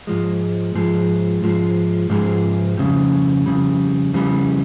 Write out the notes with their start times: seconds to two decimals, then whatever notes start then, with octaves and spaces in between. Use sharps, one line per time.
0.07 G#2 F3 G#3
0.75 G#2 F3 G#3
1.42 G#2 F3 G#3
2.10 G#2 F3 G#3
2.77 F2 C#3 G3
3.46 F2 C#3 G3
4.13 F2 C#3 G3